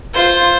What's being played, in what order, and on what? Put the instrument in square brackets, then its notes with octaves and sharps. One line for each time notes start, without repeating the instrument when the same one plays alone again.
[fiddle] F4 [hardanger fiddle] C5